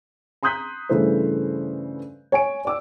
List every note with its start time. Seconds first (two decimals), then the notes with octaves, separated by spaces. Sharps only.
0.43 A#5 C6 D#6 F#6 G6 B6
0.89 G2 C#3 E3 A3 C5
2.32 C#5 G#5 D7
2.65 D5 D6 E6